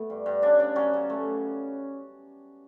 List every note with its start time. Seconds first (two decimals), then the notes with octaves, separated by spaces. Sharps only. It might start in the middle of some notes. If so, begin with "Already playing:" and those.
Already playing: A3 B3
0.10 G2
0.26 G2
0.42 C#3 D4
0.59 C#3 D4
0.76 F#3 C#4
0.93 C#3
1.10 A3